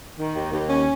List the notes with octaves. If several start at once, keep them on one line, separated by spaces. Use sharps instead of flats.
D#3
D#2
D#2
C#4